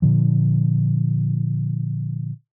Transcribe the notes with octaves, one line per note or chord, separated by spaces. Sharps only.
A#2 D3 F3